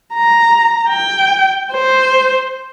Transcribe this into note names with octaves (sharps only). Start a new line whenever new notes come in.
A#5
G5
C5